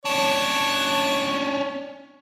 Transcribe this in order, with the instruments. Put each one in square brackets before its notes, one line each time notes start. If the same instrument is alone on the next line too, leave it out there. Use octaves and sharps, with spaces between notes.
[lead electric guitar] C#4 D4 [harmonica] C#5